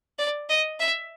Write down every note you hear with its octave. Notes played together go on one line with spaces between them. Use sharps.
D5
D#5
E5